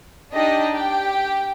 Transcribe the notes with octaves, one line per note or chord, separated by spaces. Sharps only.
D4 D#4 G4 D#5
G4 G5